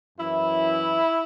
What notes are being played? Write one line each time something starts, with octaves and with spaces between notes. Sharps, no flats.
F#2 E3 E4